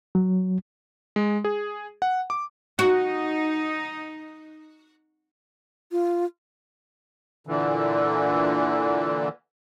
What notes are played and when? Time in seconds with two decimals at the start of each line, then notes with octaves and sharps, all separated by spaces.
0.15 F#3
1.16 G#3
1.44 G#4
2.02 F#5
2.30 D6
2.79 D#4 F#4
5.92 F4
7.47 A#2 D3 E3